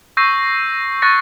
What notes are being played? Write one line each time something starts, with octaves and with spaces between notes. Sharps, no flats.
C#6 E6 G6 A#6 C7 D#7
C#6 F#6 A6 A#6 C#7